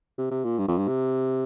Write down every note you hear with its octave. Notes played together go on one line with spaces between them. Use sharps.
C3
C3
A#2
G2
F2
G2
C3